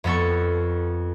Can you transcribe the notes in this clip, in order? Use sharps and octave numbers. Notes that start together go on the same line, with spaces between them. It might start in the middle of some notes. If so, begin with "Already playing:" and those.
F2 B3 A4 C#6